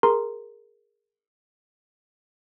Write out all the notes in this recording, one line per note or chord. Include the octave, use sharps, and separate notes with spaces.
G#4 A#4 A#5 C6